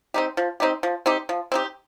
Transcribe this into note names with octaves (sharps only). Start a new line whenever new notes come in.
C4 D#4 G4
F3
C4 D#4 G4
F3
C4 D#4 G4
F3
C4 D#4 G4